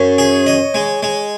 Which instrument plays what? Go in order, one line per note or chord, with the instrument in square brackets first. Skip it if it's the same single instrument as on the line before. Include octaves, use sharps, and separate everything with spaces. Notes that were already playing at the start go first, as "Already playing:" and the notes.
Already playing: [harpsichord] F#2 [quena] C#5
[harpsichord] G#4
D#5
G#3
G#3